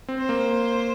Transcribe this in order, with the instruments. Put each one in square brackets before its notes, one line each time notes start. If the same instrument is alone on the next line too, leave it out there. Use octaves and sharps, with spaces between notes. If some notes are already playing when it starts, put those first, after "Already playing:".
[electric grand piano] C4
[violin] C5
[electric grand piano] A#3